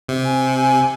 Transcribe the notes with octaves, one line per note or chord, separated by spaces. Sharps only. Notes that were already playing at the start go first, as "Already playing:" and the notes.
C3
G#5
G#5